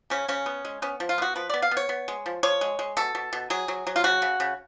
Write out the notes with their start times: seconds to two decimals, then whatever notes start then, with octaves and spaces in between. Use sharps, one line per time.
0.10 C#3 C#4
0.28 C#3 C#4
0.46 B3
0.65 G#3
0.82 B3 C#4
1.00 F3
1.09 F4
1.18 B3 F#4
1.36 F3 B4
1.50 B3 D5
1.62 F5
1.71 B3
1.77 C#5
1.89 B3
2.08 G#3
2.26 F3
2.43 F3 C#5
2.61 G#3
2.79 G#3
2.97 B2 A4
3.15 B2
3.33 B2
3.50 F#3 G#4
3.68 F#3
3.87 F#3
3.96 F4
4.04 C#3 F#4
4.22 C#3
4.40 C#3